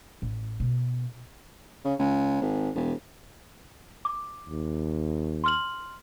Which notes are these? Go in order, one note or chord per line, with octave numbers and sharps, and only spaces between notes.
A1
B2
C#3
C#2
G#1
E1
D6
D#2
C6 F6 F#7